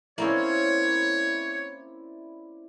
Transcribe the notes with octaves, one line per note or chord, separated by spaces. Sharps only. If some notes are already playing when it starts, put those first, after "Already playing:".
A#3 C4 C#4 E4 C#5 D5